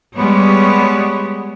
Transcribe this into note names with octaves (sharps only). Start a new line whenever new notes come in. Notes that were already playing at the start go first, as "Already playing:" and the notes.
G3 G#3 B3 C#5